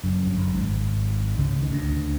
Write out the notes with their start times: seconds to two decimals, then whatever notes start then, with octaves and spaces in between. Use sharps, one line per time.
0.04 F#1 F#2
0.26 G2
0.37 F#1 F#2
0.54 G#1 G#2
1.38 C#2 C#3
1.62 D#3
1.72 D2 D3